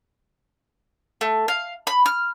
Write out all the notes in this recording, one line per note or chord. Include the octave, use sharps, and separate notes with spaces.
A3
F5
B5
F6